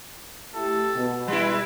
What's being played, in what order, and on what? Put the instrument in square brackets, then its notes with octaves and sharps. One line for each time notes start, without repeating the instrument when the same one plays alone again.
[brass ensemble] A3 E4 G4 [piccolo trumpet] A4
[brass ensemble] B2
[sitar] G3 E4 [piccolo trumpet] B4